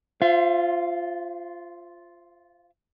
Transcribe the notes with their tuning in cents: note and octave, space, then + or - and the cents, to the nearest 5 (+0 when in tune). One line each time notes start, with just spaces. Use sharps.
F4 +0 C5 +0 E5 +45